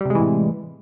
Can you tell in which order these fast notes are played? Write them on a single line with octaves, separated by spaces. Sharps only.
G3 C3 G#3 E3 A2